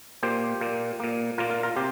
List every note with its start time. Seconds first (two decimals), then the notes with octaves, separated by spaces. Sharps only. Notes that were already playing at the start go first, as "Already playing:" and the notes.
0.23 A#2 A#3 G4 C5
0.61 A#2 A#3
1.00 A#2 A#3
1.38 A#2 A#3 F4 A#4
1.51 F4
1.63 F4 A#4
1.77 C3 G4 C5